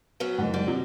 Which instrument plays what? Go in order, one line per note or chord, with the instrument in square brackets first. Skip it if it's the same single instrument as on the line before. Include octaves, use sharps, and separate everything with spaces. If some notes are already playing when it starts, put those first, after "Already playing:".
[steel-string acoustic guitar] F#3 B3 C#4
[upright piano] F#1 F#5 [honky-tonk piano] G#2
[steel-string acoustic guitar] G3
[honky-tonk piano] C3 F#3